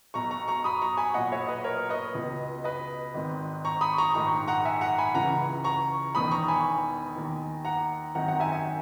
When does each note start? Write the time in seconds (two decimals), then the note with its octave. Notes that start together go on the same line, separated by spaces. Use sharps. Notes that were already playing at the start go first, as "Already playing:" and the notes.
0.14 B1 B2 A#5 C#6
0.31 A#5 C#6
0.48 A#5 C#6
0.64 B5 D#6
0.82 A#5 C#6
0.97 G#5 B5
1.14 B1 A#2 D#5 F#5
1.32 C#5 E5
1.47 B4 D#5
1.64 A#4 C#5
1.89 B4 D#5
2.15 C#2 B2
2.64 B4 D#5
3.14 G#1 G#2 D#3
3.65 A#5 C#6
3.81 B5 D#6
3.98 A#5 C#6
4.14 A#1 G#2 D#3 A#5 C#6
4.48 F#5 A#5
4.65 E5 G#5
4.81 F#5 A#5
4.98 G#5 B5
5.14 C#2 C#3 E3 F#5 A#5
5.64 A#5 C#6
6.15 E1 E2 D#3 B5 D#6
6.31 A#5 C#6
6.48 G#5 B5
7.16 D#2 D#3
7.65 F#5 A#5
8.15 G#1 F#2 D#3 F#5 A#5
8.28 F#5 A#5
8.40 E5 G#5
8.52 E5 G#5